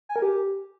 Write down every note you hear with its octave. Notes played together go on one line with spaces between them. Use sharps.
G#5
A#4
G4